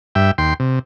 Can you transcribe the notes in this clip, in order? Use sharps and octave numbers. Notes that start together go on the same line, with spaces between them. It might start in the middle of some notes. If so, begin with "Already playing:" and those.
G2 E5 G5
D#2 G5 C6
C3